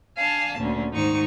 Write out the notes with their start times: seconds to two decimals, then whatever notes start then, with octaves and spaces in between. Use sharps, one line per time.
0.18 D4 F5 G#5 A5
0.58 D2 A#2 C#4
0.92 G#2 D#3 D#4 C5 C#6